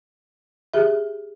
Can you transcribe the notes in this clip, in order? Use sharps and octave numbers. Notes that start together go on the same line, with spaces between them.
G4 G#4 E5